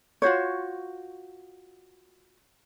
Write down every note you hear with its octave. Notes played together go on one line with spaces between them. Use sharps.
F4 F#4 C5 C#5